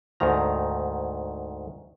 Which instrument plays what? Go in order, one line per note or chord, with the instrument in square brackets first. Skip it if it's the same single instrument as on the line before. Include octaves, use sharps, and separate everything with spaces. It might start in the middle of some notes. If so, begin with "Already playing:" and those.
[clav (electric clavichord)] D2 G#2 D#3 A#5